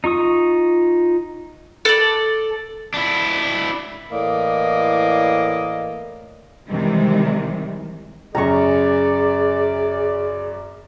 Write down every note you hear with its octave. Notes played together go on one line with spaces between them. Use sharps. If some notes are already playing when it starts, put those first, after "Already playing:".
D#4 F4 C#6 D#6
A4 D5
D4 E4
A2 E3 A#3 D5 D#5
C3 D#3 E3 G3 G#3
F#2 C#3 G#4 D5 A#5 C#6